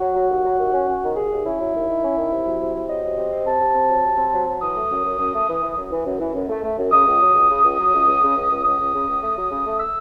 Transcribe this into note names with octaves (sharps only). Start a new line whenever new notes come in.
F#3 F#4
F#3
D#2
F#3
D#2
C#4
C#4
D#3
D#2 G#4
D#2
C#4 E4
F#3
D#2
D#3
C#4
D#3
C3
F#3
C3
C3
F#3 D#5
C3
C3
C4
C3 A5
C3
C4
F#3
C3
C4
F#3
F#3
E3 D#6
A3
F#2
F#2
F#2
A3
E3
E3
F#2
E3
F#2
E3
F#2
A3
A3
F#2
C#3 D#6
C#2
F#3
C#2
C#3
C#2
F#3
C#2
C#2
C#3
C#2
C#2
C#2 D#6
C#2
C#3
C#2
A3
F#3
C#3
A3
E6